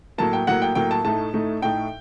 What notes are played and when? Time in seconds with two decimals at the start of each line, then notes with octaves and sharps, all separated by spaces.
0.18 A2 F#3 A#3 A5
0.33 G5
0.47 A2 F#3 A#3 F#5
0.62 G5
0.75 A2 F#3 A#3 G5
0.91 A5
1.04 A2 A3 D#4 A5
1.34 A2 A3 D#4
1.62 A2 A3 D#4 G5